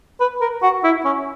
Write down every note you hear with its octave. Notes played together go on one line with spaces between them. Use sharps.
B4
A#4
F#4
E4
C#4